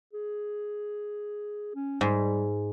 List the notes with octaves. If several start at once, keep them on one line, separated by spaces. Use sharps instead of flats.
G#4
C#4
G#2 G3